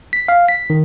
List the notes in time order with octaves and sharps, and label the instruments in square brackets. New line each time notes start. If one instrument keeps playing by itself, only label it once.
[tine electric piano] B6
F5
B6
D#3